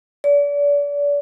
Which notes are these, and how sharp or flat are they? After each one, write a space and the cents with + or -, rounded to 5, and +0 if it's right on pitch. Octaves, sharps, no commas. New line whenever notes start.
D5 -35